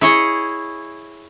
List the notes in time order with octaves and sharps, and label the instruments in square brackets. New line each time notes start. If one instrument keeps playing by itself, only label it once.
[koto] E4 G#4 C#5 D#5